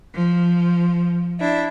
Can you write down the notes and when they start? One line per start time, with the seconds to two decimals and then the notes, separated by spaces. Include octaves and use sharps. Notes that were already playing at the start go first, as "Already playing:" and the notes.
0.13 F3
1.39 D4 E4